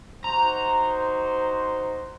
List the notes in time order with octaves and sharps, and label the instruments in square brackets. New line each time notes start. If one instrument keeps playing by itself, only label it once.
[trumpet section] D#4 F#4 C5 [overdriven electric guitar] A#5